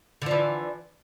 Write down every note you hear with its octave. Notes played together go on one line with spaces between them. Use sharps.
D3 E3 F3